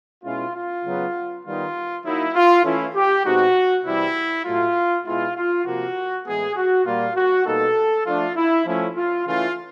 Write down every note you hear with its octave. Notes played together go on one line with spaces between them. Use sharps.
B2 G#3 C#4 E4 F4
F4
C#3 F#3 B3
D#3 G3 B3 D#4 F4
F#3 A#3 D#4 E4
F4
E3 A3 C#4 E4
G4
B2 G#3 C4 D#4 F#4
C3 E3 G3 E4
A2 F#3 A3 F4
B2 G#3 B3 E4 F4
F4
C3 F3 A#3 F#4
A2 E3 G#3 B3 G#4
F#4
A#2 G3 A#3 F4
F#4
B2 G3 A#3 D#4 A4
F3 A3 D4 F4
E4
F3 A3 C#4 E4
F4
C#3 E3 A3 F4